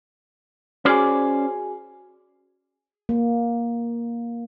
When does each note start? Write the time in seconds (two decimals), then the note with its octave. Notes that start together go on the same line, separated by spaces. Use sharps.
0.85 C#4 F#4 G#4 C5 D5 G#5
3.09 A#3